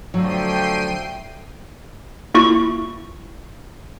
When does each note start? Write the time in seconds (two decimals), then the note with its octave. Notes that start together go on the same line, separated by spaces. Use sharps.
0.14 D3 F3 F#3 A3 G5 C7 D#7
2.34 A#3 E4 F4 C#6